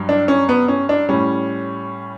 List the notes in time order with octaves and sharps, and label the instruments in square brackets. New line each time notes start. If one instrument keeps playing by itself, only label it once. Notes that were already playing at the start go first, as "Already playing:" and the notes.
Already playing: [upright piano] G2 F#3
D4
C#4
B3
C#4
D4
A2 G3 C#4